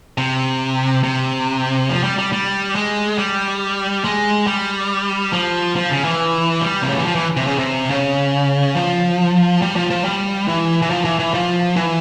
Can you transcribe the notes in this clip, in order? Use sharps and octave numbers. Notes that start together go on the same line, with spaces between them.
C3
C3
F3
G3
G3
G3
G#3
G3
G#3
G3
F3
F3
C#3
E3
G3
C3
C#3
E3
F3
E3
C3
C#3
C3
C#3
F3
G3
F3
F3
G3
E3
E3
F3
E3
E3
F3
E3